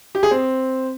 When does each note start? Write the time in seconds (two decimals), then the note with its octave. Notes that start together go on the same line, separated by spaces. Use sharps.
0.15 G4
0.23 G#4
0.31 C4